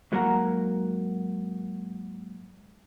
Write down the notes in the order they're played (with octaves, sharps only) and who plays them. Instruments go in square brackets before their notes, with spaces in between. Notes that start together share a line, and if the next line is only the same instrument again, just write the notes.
[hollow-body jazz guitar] G#2 F#3 A#3 A#4 F#5 A#5